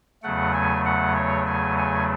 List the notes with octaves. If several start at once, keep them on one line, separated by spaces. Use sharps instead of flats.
E2 C#3 F#3 A3 F#5
G#5
F#5
C#5
G#5
G#5